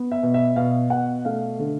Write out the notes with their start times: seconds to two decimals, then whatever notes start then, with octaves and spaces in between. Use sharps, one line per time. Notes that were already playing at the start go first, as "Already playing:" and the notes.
Already playing: B3
0.12 E5
0.23 B2
0.34 E5
0.56 B2 F5
0.90 B2 F#5
1.25 A3 F5
1.59 D3